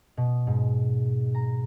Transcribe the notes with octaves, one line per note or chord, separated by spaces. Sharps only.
B2
G#2
A#5